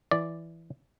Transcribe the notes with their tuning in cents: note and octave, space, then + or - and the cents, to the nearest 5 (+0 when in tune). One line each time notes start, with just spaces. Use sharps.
E3 +5 D5 +0